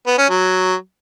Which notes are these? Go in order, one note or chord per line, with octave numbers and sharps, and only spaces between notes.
B3
C#4
F#3